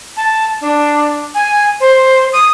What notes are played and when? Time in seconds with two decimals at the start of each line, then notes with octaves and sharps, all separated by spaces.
0.17 A5
0.61 D4
1.34 G#5
1.80 C5
2.33 D#6